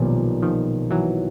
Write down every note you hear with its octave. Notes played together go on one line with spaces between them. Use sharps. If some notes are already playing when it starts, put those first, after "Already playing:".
Already playing: B1 A#2 D#3 F3 G3
D#3 F3
E3 F#3